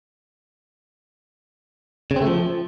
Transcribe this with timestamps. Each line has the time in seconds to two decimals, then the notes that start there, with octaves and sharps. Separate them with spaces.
2.11 C#3
2.16 C4
2.22 A3
2.27 F3